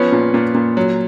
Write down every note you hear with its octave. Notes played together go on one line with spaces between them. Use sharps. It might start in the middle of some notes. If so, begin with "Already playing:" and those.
Already playing: F3 B3 C#4
A#2
A#2
A#2
F#3